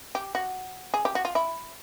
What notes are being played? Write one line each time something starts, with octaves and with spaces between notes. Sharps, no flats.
G4
F#4
G#4
G4
F#4
F4
E4